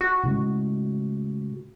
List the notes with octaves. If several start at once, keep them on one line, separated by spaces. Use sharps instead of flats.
F#4
A2 C#3 G#3